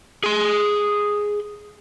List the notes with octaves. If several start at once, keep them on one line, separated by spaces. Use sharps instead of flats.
G#4 C6